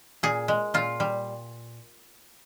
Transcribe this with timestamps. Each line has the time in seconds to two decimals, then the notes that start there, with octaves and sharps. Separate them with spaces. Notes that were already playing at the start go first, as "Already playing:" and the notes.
0.23 A#2 G#4
0.48 G#3
0.74 A#2 F4
1.00 G3